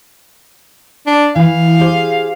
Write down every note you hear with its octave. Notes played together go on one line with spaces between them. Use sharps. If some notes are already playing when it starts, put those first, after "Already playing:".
D4
E3 F5
G4 G#4 C5